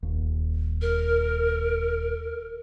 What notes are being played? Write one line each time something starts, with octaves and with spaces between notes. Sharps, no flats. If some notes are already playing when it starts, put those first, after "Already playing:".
D#1 D#2
A#4